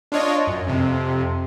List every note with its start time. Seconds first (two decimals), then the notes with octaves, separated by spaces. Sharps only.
0.12 D4 F4 C#5 D#5
0.47 F#2
0.67 F2 C3